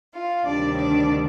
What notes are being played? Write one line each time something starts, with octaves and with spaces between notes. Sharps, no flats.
F4 F5
D2 C3 D#3 G3 D4 D5
D4 D5